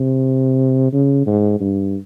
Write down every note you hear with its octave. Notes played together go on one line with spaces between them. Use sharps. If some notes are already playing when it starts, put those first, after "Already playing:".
Already playing: C3
C#3
G#2
G2